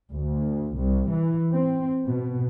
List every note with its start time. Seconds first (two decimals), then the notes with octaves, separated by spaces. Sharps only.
0.12 D2
0.78 C2
1.12 E3
1.52 C4
2.06 B2